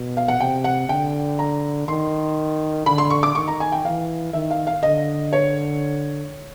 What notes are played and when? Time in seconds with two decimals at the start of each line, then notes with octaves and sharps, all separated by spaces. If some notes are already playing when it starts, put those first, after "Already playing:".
Already playing: B2
0.17 F5
0.28 F#5
0.40 C3 G5
0.64 F#5
0.89 D3 G5
1.39 A#5
1.88 D#3 C6
2.86 D3 B5
2.98 C6
3.10 C#6
3.23 D6
3.35 D#3 C#6
3.48 A#5
3.60 G#5
3.72 G5
3.84 E3 F5
4.33 D#3 E5
4.51 F5
4.67 F5
4.83 D3 D#5
5.33 C#5